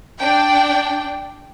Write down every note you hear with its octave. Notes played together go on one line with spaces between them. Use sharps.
D4 G5